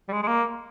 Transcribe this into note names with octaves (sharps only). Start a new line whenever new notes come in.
G3
G#3
G#3
A#3